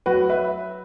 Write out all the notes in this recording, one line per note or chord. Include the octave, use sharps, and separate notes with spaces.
F#3 F#4 B4
B4 E5